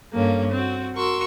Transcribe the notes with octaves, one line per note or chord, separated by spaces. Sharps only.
G2 D3 A#3 C#4
C4 F#4
F#4 A#4 C6 C#6 E6